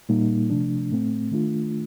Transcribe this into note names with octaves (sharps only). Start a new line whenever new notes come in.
A#2 G3 A#3 D#4
C3 F3 A3 D4
A2 A3 C4
D#3 A3 D4 F4